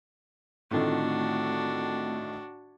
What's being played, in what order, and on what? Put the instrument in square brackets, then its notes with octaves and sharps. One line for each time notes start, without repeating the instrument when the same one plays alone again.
[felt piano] A2 D3 D#3 [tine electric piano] A3 C4 F4 [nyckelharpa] D4 F#4